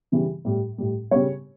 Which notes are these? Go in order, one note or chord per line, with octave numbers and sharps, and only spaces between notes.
C#3 E3 G3
A2 G3
A2 G3
C#3 G3 C#5